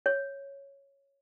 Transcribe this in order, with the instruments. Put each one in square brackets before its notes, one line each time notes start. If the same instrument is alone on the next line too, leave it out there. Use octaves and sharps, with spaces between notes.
[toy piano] C#5